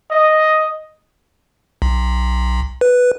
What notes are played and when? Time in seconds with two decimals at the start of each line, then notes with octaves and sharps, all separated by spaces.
0.11 D#5
1.82 B1
2.81 B4